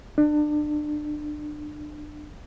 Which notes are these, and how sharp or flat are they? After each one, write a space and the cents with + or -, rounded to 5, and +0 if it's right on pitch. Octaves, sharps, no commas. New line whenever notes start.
D4 +30